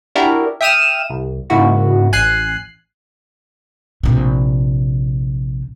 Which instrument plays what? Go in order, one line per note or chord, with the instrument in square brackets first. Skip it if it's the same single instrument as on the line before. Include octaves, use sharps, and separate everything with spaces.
[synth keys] D4 E4 F#4 G4 A#4
E5 G5 D#6 F6 D#7 E7
C2
G#2 C#3 A#3 E4 F#4
A1 G#5 F#6 C7
[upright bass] A#1 C3